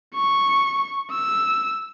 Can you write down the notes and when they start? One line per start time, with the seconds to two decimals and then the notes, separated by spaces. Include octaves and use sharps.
0.15 C#6
1.11 E6